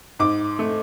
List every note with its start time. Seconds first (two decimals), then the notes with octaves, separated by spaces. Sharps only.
0.19 G#2 D6
0.59 A3